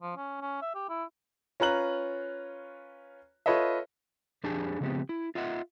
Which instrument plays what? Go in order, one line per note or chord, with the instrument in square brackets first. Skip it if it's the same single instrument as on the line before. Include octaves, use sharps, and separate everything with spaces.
[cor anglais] F3
C#4
C#4
E5
G4
E4
[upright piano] C#4 F4 B4 A#5 F#6 F#7
F4 A4 B4 C#5 D#5 E5
[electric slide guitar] F2 D4 G4 G#4 G#5 A5
C#3 F3 G#3 B3 C4 G4
E4
F4 D#5 E5 F#5